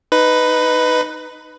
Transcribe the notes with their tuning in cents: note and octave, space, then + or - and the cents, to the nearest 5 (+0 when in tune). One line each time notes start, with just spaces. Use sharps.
D#4 +0 B4 +10